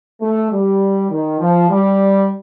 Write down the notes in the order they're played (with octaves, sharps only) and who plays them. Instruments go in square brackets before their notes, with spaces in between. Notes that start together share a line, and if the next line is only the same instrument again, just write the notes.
[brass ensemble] A3
G3
D#3
F3
G3